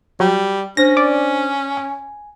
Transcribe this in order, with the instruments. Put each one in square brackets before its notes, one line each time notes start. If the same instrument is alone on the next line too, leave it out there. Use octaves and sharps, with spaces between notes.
[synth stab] F#3 [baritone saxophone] G3
[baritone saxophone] C#4 [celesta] D4 C5 [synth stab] A#6
[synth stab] D5
[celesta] G#5